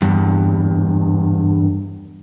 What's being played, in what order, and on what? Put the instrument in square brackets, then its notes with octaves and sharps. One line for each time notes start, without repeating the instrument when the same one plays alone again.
[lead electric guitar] E2 G2